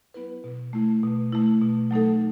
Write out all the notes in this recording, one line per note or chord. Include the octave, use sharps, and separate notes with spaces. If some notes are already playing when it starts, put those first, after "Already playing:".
F#3 B3 E4 B4
B2
A3 E4
B2
A3 E4
B2
F#3 A3 D#4 A4